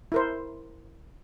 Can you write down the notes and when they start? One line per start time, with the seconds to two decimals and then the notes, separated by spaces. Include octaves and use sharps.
0.12 E4 A#4 C5